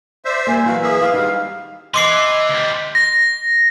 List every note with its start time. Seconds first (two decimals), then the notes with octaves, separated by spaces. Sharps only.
0.25 C5 D5 E5
0.47 G3 A#3 G#5
0.66 E3 F#3 F#4 F5
0.83 A#3 G#4 E5
1.01 E4 F5
1.13 G#2 D#3 G3 D#4 F#4 C5
1.94 E3 D#5 C6 D6 C7
2.50 D2 G3
2.95 A#6